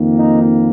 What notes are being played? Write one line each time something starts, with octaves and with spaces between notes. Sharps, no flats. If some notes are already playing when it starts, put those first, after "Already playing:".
Already playing: F2 D#3 A#3
D#4